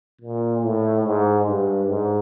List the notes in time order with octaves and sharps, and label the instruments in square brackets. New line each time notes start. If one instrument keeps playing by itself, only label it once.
[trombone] A#2
A2
G#2
G2
G#2